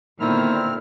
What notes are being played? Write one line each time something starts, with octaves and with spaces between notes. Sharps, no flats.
A#2 D3 D#3 B3 C4 E4 F6